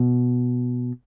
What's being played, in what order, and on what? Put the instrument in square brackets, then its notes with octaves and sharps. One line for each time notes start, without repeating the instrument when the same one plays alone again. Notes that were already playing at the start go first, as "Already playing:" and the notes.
Already playing: [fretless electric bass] B2